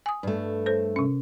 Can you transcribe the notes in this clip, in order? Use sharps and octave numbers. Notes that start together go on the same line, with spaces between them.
G#5 D#6
G2 A3
A4 C5
C3 C#4